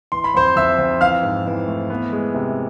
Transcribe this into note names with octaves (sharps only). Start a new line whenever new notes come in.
E3 C6
B5
F2 C5 C6
F2 E5 E6
F2
E3 F5 F6
G#2
E3
A3
B3
G#3
C3